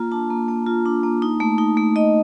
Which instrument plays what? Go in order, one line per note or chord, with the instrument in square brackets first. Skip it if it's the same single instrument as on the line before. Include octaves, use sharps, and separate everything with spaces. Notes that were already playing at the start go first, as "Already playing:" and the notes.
Already playing: [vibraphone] A#3 F4 A#5
D4 A5
A#3
A#3
F4
D4
A#3
D#4
A3
D#4
A3
D#4 D#5